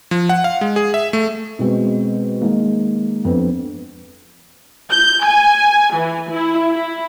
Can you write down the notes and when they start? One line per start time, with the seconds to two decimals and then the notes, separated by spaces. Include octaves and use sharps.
0.11 F3
0.29 F#5
0.44 F5
0.61 G#3
0.76 G#4
0.94 E5
1.13 A3
1.59 B2 G#3 C4
2.41 D#3 G#3 A#3
3.25 F2 B3 C4 D4
4.91 G6
5.25 G#5
5.96 E3
6.31 E4
6.69 E4